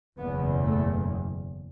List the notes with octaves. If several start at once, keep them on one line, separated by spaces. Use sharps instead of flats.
F#1 E2 B2 B3
A3